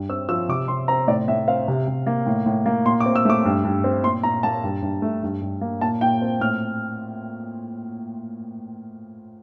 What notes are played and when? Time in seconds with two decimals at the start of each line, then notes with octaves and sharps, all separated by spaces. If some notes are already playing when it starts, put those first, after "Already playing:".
Already playing: G2
0.09 C4 E6
0.29 F3 E6
0.48 C3 D6
0.68 C3 C6
0.88 C4 A#5
1.08 A2 D5
1.28 A2 E5
1.48 C4 F5
1.68 C3
1.88 C3
2.07 A#3
2.27 A2
2.46 A2
2.66 A#3
2.85 A#2 C6
3.00 D6
3.06 C4
3.16 E6
3.25 A3 D6
3.45 G2
3.64 G2
3.84 C4
4.04 A#2 C6
4.23 A#2 A#5
4.43 A#3 A5
4.64 G2
4.82 G2
5.02 A3
5.23 G2
5.42 G2
5.61 A#3
5.81 A#2 A5
6.01 A#2 G5
6.22 C4
6.40 A2 F6